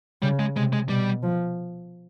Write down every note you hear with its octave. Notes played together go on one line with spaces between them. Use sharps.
C#3 G3
G#3
C3 G#3
G#3
B2 G3
F3